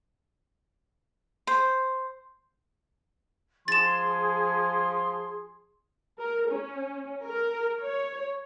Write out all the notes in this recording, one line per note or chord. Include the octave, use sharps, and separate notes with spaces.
C5
F3 G#4 C6 A6 E7
A#4
C#4
A#4
C#5